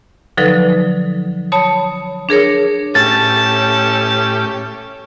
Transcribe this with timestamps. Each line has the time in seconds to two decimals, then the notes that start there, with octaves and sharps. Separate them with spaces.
0.37 D3 F3 F#3 D#4 A4 B4
1.52 C#5 A5 B5 D#6
2.29 D4 G#4 A#4 C#5
2.95 A2 C#4 G4 A5 A6